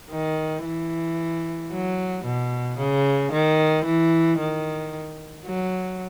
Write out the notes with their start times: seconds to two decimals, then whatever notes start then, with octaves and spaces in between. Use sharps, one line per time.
0.11 D#3
0.65 E3
1.71 F#3
2.25 B2
2.79 C#3
3.32 D#3
3.85 E3
4.40 D#3
5.46 F#3